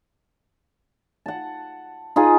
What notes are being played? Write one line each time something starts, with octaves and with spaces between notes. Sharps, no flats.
F#5 A5
D#4 F4 G#4 B4